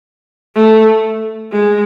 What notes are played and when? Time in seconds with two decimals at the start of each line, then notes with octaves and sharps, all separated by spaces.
0.55 A3
1.52 G#3